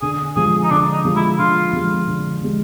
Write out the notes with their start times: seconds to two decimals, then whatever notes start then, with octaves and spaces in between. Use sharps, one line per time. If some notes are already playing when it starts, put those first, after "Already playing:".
0.02 D3 G#4
0.36 F3 G#3 G#4
0.63 D#4
0.70 D3 D4
0.93 D#4
1.05 F3 G#3
1.16 E4
1.39 D3 F4
1.73 F3 G#3
2.07 D3
2.41 F3 G#3